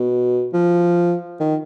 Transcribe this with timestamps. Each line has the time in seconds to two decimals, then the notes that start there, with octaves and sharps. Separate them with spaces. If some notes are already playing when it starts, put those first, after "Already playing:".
Already playing: B2
0.53 F3
1.40 D#3